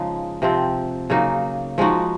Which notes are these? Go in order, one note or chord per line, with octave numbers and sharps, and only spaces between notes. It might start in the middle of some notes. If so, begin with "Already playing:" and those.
Already playing: C#3 F3 G#3 D#4
C3 F3 C4
C#3 F#3 A#3 D#4
F3 G#3 D#4 F#4